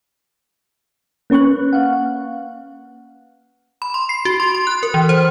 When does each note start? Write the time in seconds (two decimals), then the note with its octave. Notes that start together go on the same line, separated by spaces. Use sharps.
1.30 A#3 C#4 B4 C#6 F#6
1.73 F5 F#5
3.82 B5
3.94 C6
4.09 C7
4.25 F#4
4.40 C6
4.54 C6
4.67 F#6
4.83 A#4
4.94 E3
5.09 C5